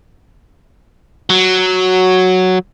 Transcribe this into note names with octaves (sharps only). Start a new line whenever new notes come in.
F#3